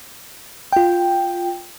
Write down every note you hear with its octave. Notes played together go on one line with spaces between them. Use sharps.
F4 G5